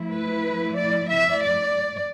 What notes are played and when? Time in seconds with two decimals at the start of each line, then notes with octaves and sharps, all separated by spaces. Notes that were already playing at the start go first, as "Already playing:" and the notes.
Already playing: F3 A3 E4
0.10 B4
0.74 D5
1.08 E5
1.39 D5